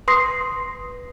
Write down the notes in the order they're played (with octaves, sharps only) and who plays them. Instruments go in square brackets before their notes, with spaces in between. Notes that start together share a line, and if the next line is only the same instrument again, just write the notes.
[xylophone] B4 C6 D#6 A#6 C7